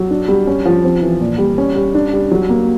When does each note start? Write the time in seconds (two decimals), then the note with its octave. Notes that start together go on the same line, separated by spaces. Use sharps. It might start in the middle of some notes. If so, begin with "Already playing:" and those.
Already playing: F#3
0.11 D4
0.28 G3
0.47 C#4
0.65 F3
0.84 C4
1.02 E3
1.21 A#2
1.38 G3
1.58 C#4
1.76 G3
1.95 D4
2.13 G3
2.31 F#3
2.49 A#3